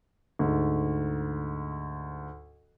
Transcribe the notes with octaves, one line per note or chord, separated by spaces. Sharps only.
D2 G#2